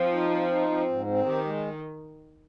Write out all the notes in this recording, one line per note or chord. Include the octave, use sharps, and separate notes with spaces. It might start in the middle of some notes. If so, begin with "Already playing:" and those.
Already playing: F3 C4
D#4
C4
D#4
C4
G#2
C4
D#3 G4
G#3